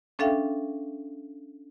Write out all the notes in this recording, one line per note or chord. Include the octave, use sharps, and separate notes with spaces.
C#4 D4 A4 E5 F5 G5